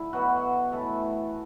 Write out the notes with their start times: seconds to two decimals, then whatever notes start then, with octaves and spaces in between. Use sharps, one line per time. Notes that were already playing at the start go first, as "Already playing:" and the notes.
Already playing: D3 A3 E4
0.13 B2 F#3 B3 F#4
0.72 A2 E3 A3 A4